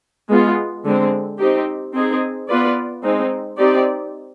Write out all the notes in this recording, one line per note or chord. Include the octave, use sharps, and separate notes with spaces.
G#3 B3 F4
D3 G#3 C4
C4 D#4 G4
C4 D#4 G#4
B3 F4 B4 D5
G#3 C4 D#4
C4 D#4 G4 D5